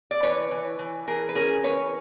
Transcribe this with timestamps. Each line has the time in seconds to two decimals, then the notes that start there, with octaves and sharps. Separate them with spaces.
0.11 D5
0.23 E3 B4 C#5
0.51 E3
0.79 E3
1.07 E3 G#4 A#4
1.29 B4
1.35 C#4 G#4 A#4
1.63 E3 B4 C#5